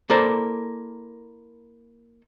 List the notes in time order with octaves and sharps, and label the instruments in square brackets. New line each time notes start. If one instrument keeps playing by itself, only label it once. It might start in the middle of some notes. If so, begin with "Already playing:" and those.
[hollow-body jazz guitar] A#3 E4 A4 A#4 C5 D5